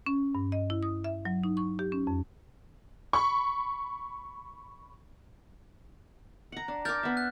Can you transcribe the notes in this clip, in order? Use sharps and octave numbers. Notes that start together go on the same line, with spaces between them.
C#4
G2
D#5
E4
D#6
E5
F#3
D#4
C#6
G4
C#4
F2
B5 C#6
F#5 A#5
D4
A#4 F5 D6 F6 G6 A6
B3 E5
F#6